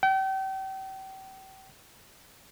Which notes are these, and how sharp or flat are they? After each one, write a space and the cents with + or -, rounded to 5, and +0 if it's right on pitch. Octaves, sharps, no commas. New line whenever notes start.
G5 -35